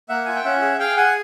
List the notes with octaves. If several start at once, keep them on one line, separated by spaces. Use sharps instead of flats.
A#3 E5 F#5
F4 G#5
G5
C#4 E5 F#5
G#4
G#4 F5 G5
G#4 F#5 G#5